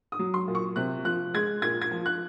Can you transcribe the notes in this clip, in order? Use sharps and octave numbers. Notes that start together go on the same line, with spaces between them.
D#6
F#3
C6
A#2
C#6
C3 F#6
F3 F#6
G#3 G#6
A#2 G#6
G#6
F3
F#6